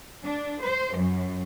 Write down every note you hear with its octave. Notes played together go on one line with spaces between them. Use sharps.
D4
C5
F#2